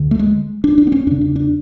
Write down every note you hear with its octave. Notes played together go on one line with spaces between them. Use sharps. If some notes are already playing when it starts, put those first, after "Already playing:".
Already playing: D2 D3
A3
G#3
D4
D4
B3
C#4
E2 C#3 D4
D4
D4